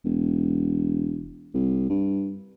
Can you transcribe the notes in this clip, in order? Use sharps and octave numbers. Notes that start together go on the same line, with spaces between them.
E1
C2
G2